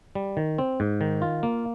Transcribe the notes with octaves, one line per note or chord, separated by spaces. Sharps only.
G3
D#3
C4
G#2
D#3
F4
A#3